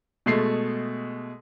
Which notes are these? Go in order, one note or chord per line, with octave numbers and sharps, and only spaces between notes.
B2 G#3 A3 C7